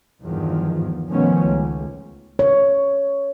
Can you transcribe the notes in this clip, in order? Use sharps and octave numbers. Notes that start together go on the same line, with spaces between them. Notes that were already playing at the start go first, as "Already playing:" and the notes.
E2 G2 D#3 F3
B2 D#3 F3 A3 B3 C#4
C#2
C#5